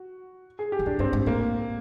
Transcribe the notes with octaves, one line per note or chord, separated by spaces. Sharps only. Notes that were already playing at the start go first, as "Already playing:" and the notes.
Already playing: F#4
G#4
G4
E2
F2 D4
G2 C4
G#2
A2 A#3